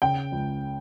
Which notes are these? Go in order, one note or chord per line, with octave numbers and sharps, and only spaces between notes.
C#3 G5
C#2